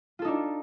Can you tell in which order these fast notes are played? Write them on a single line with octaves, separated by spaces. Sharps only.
F4 A4 D#4 D4